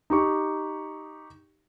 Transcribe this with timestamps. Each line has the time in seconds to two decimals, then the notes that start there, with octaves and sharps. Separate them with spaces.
0.10 D#4 G4 C#6